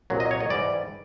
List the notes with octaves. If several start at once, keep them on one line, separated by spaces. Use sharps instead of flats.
C2 A#2 F#3
D#5
C#5
D#5
G#2 E3 G3 D5